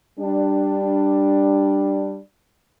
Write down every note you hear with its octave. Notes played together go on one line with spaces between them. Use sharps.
G3 D4